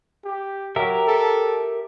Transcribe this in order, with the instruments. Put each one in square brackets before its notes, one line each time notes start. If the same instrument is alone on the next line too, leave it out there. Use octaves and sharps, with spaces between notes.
[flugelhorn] G4
[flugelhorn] F#3 [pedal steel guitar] G4 A#4 E5
[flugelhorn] A4